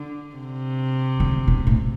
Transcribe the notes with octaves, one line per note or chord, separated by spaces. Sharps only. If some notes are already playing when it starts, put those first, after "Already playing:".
Already playing: D3
C3
D3
B2
A2